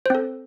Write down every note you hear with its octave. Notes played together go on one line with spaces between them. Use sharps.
C4 A4 C5